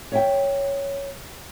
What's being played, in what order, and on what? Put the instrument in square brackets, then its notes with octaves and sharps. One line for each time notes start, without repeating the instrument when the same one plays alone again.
[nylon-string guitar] C#5 E5 G5